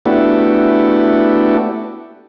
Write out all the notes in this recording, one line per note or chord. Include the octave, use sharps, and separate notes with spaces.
A3 B3 D4 E4 F#4 G4